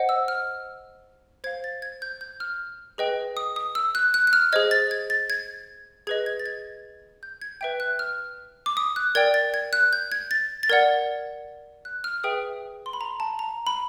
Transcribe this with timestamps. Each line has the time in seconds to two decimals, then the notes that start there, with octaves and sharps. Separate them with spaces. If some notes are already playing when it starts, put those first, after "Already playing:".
Already playing: C5 D#5 F#5
0.09 E6
0.28 F6
1.44 C5 F5 G#6
1.64 A6
1.82 G#6
2.02 G6
2.21 G6
2.40 F6
2.98 G#4 B4 D#5 G5
3.37 D#6
3.56 D#6
3.75 E6
3.95 F#6
4.14 F#6
4.27 F#6
4.33 F6
4.53 G#4 C5 D#5 G#6
4.71 A6
4.91 G#6
5.10 A6
5.30 G#6
6.07 G#4 B4 D#5 G#6
6.26 G#6
6.40 A6
6.46 G#6
7.23 G6
7.42 G#6
7.61 B4 E5 G5 G6
7.80 F#6
7.99 F6
8.66 D6
8.77 D#6
8.96 F#6
9.15 A#4 D5 G5 G#6
9.34 A6
9.54 G#6
9.73 F#6
9.93 G6
10.12 G#6
10.31 A6
10.63 A6
10.69 A#4 D5 F#5 G#6
11.85 F#6
12.04 F6
12.24 G#4 B4 E5 G5 D#6
12.86 C6
12.93 B5
13.01 A#5
13.20 A5
13.39 A#5
13.67 B5